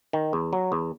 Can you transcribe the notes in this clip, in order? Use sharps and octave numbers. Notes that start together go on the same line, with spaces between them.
D#3
E2
F#3
E2